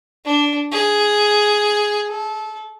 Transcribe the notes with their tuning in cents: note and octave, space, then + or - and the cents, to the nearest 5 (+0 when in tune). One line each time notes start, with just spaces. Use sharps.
D4 -10
G#4 +5
A4 -25